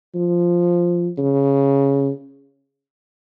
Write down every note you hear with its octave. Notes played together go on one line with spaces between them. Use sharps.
F3
C#3